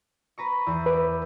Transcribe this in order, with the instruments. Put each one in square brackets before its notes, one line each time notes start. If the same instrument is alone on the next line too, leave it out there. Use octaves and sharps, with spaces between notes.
[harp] B4 A#5 C#6
E2
[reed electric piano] B4 [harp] D6